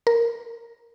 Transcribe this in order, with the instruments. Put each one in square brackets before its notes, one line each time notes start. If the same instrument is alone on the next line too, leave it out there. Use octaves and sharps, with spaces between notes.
[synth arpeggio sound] A#4